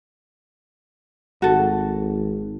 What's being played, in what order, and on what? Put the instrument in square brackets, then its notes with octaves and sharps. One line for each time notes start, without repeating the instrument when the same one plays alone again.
[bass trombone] G#1 [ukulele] F#4 A4